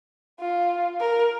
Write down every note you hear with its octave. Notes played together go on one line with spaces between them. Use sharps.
F4
A#4